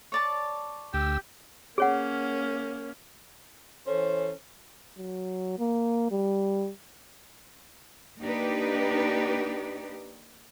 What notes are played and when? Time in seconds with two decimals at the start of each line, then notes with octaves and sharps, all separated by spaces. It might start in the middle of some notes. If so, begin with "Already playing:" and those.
0.12 C#5 D5 A5
0.94 D2 G4 E6
1.78 A#3 C#4 G#4 C#5 F#5
3.87 E3 C#4 A4 C5
4.98 F#3
5.59 A#3
6.11 G3
8.21 A#3 D4 D#4 G4 B4